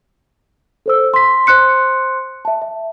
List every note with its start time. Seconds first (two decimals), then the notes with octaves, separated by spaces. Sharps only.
0.86 A4 C5 E6
1.14 C6 B6
1.47 C5 C6 F#6 C#7
2.45 E5 A5
2.62 E5